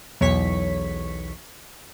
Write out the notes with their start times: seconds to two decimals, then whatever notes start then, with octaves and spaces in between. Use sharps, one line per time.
0.21 B1 E2 C#5 C#6 B6